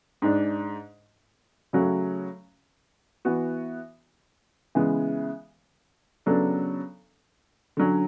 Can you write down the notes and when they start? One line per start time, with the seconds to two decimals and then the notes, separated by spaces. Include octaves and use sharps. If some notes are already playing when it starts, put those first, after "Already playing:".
0.22 G#2 G#3 D4
1.73 C#3 F#3 A3 C#4 F#4
3.25 E3 B3 F#4
4.75 C#3 E3 G#3 B3
6.26 C#3 F#3 B3 D4 A4
7.77 D3 F#3 C#4